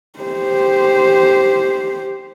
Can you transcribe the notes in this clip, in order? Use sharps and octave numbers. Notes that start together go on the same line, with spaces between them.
G4 C5